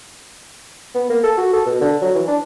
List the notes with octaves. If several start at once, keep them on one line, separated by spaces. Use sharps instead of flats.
B3
A#3
A4
F#4
A4
B2
D3
F#3
E3
D4